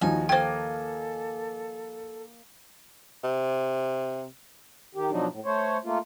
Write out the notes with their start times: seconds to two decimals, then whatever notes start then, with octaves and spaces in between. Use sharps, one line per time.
0.01 D#2 F3 D#4 F#4 G#5
0.29 A#3 A4 C5 G5 G#5
3.24 C3
4.95 D#3 G4
5.11 B2 F3 F#3 D4 D#4
5.31 A2
5.45 A3 C5 C#5
5.85 A3 A#3 F4